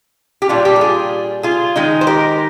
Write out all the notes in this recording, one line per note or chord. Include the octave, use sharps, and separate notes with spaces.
G4
A#2 G3 D4 F4
G4
A#4
F4 G#4
F4 G#4
D#3 G#3 D#4
C5
G4 A#4